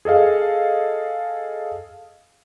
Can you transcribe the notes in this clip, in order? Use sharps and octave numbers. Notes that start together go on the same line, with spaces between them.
G#4 A4 D#5 F5